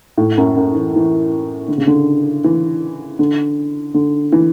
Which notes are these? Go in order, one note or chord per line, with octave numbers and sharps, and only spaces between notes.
A2
F#2
F#2
E3
E3
D3
C#3
D3
E3
D3
D3
E3